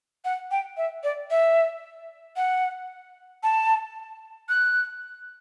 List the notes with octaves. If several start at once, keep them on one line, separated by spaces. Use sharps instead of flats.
F#5
G5
E5
D5
E5
F#5
A5
F#6